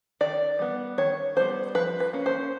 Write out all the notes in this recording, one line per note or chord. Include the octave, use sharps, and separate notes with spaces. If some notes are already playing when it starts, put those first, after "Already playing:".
D#3 D5
G3 B3
D#3 C#5
G3 B3 C5
F3 B4
B4
A#3 C#4
C5